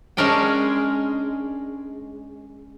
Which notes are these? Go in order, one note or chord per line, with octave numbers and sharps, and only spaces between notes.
G#3 C#4 D4 A#4 D5 G5